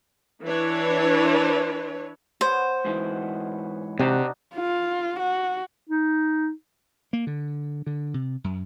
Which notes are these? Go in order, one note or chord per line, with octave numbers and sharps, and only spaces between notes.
E3 D4 E4 B4 C#5
B3 C5 C#5
G#2 E3
C3 D4 D#4 F#4
F4
F#4
D#4
A#3
D3
D3
C3
F#2